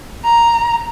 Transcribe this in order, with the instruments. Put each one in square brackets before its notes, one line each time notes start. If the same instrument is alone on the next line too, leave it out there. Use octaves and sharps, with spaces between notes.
[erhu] A#5